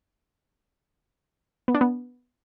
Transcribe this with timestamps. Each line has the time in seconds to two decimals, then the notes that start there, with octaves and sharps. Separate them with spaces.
1.68 B3
1.75 D4
1.81 B3